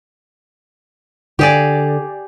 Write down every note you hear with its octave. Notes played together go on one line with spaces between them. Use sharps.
D3 G4 G#4 D5